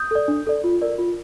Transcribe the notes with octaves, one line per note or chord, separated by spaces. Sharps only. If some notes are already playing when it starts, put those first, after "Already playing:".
Already playing: D#6 G6
A4 D5
D4
A4 D5
F4
A#4 D5
F4